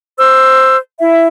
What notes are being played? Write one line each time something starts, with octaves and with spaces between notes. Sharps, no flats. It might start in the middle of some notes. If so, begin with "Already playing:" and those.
C5 E6
E4 E5